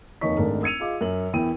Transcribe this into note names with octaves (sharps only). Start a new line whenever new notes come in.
F1 D#2 D#4 C#5 C#6 B6
G#1 G#3 A3 D4 A#4 A5
E6 G#6 C#7 D#7 F7
F4 G#4 D#5 D6
F#2 F#7
E2 E3 E4 A#4 G5 D#7